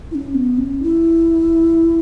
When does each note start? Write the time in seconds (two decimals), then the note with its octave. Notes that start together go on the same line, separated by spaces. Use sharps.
0.11 E4
0.15 C#4
0.34 B3
0.58 C#4
0.83 E4